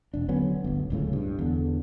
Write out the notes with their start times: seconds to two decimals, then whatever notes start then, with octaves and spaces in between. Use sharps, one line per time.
0.14 E1 D4
0.28 D3 F#3 B3 C#4
0.64 D1 G1
0.90 D1 C#2 A2 C#3
1.13 G2
1.39 E2 D3